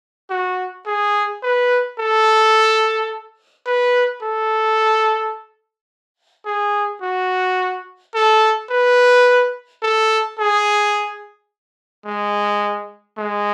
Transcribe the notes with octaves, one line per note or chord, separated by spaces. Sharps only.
F#4
G#4
B4
A4
B4
A4
G#4
F#4
A4
B4
A4
G#4
G#3
G#3